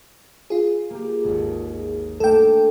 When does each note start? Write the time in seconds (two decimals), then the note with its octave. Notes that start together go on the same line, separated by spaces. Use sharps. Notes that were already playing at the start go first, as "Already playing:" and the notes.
0.50 F4 G#4
0.90 A#3 G4
1.24 G#1 D#2
2.20 A3 A#3 D4 A4 G5